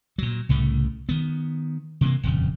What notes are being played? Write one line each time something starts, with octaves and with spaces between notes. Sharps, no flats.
A#2 F#3
C2 A2 C#3 A3
D#3 B3
C3 E3 A#3
D#1 F2 C#3